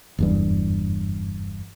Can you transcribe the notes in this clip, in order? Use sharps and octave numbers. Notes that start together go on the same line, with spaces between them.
F#1 E2 G2